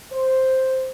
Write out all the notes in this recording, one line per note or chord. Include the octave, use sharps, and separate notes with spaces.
C5